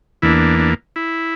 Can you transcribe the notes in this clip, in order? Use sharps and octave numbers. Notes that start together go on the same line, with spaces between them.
E2 E3 A#3 D4 E4
D4
E4